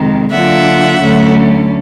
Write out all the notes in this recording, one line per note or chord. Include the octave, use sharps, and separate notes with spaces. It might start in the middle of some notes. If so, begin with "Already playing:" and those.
Already playing: F2 C3 D#3 G#3
D3 F#3 A#3 D4 F4 E5 F#5
D2 D3 F#3 A3 C#4